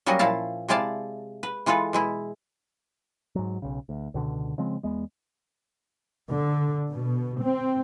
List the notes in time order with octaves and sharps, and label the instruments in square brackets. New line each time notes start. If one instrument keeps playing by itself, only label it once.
[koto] F#3 G3 A#3 C#4 F#4 D#5
A#2 F3 E4 F5 A5
C3 G#3 E4 D5 F5 A5
B4
E3 G#3 F4 A4 B4
B2 G#3 E4
[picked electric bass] G#2 F#3
B1 C#3
D2
C#2 B2 D3
C#3 F3 G#3 C4
E2 G#3 B3
[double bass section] D3
B2
C4